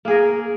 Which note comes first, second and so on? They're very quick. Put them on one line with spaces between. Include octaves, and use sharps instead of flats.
A#3 G#4 A#4